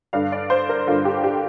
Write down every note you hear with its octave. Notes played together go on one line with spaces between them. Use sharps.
G2 D3 F5
D5
C5
A#4
G2 D3 F4
G4
G4